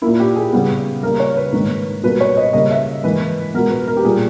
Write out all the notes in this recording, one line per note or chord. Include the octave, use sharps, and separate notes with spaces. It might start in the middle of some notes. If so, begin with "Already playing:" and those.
A#2 A#3 E4
G4
G#4
C#3 G3 B3
C#3 G3 A#3 A#4
C#5
B4
G#2 D#3 A#3 B4
B2 G3 A#3 B4
C#5
D#5
C#3 G3 A#3 D#5
E5
G#2 E3 A#3 B4
B2 G#3 B3 A#4
B4
A#4
G4
A#2 G3 A#3 G#4